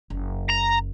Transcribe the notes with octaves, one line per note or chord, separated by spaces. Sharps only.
F#1
A#5